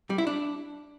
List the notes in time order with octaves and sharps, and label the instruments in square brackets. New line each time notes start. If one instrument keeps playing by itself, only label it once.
[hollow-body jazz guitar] G3
E4
D4